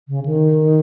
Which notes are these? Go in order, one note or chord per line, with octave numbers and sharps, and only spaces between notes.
C#3
D#3